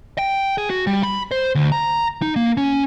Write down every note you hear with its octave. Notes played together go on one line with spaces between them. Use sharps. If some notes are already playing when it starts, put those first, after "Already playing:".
G5
G#4
F#4
G3
B5
C5
D2
A#5
D#4
A#3
C#4